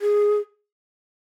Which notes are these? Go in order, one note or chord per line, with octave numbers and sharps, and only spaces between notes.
G#4